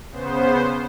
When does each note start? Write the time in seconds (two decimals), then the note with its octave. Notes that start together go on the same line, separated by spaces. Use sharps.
0.11 C#3 B3 C5